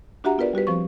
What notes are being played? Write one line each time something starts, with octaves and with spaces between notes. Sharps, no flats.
D4 F#4 G4 E5 F#5 A#5
B3 F4 A#4 B4 D5
G3 F#4 G4 B4
F3 C4 C5 C#6